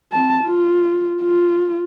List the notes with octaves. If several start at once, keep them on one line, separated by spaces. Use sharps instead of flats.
C4 A5
F4
F4